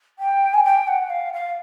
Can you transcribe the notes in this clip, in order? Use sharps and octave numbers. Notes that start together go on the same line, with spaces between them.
G5
G#5
G5
F#5
F5
F5